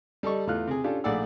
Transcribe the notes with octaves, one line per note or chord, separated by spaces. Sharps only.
G3 A4 D#5 C#6
E2 A3 F4 F6 F#6
C3 G#4
C#4 D4 F4 G4 A4
A#1 A3 G#4 D5 F#5 E6